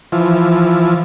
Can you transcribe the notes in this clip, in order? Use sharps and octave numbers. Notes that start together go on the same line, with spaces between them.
E3 F3